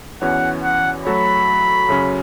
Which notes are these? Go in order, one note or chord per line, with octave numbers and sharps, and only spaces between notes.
E2 E3 C#4 F#4 C#5 F#5
F#5
F#3 A3 F#4 A4 C#5 B5
F#2 C#3 F#3 C#4